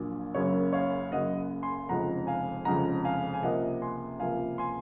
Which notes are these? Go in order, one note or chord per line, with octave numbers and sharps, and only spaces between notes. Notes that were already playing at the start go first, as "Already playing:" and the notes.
Already playing: A#1 A#2 F#3 A#3
F#1 F#2 C#3 F#3 A#3 C#5
C#5 F5
F#1 F#2 C#3 F#3 A#3 D#5 F#5
G#5 C6
F1 F2 C#3 F3 G#3 F#5 A#5
F5 G#5
F1 F2 C#3 F3 G#3 F#5 A#5
F5 G#5
G#5
C#2 C3 F3 A#3 D#5 F#5
G#5 C6
C#2 C3 F3 A#3 F5 G#5
G#5 C6